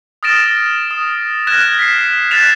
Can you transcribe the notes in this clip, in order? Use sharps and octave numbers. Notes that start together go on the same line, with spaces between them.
D#6 F6 A6 A#6 D7 E7
D#6
F6 F#6 G#6 A#6 E7
B6 C7
F#6 A6 B6 C7 E7 F7